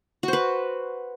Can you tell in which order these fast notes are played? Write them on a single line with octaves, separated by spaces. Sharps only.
F#4 C5 B4